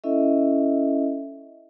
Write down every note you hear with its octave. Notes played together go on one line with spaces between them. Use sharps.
C#4 E4 A4 D#5 E5